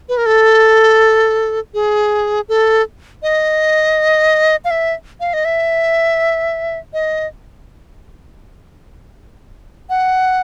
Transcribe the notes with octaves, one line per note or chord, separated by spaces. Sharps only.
B4
A#4
A4
G#4
A4
D#5
F5
E5
F5
D#5
E5
D#5
F#5